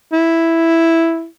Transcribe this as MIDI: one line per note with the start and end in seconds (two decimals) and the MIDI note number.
0.13 1.26 64